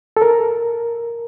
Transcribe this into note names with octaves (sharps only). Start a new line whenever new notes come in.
A4
A#4